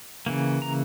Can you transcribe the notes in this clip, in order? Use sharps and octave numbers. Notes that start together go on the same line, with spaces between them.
C#3 E3 A#3
A#5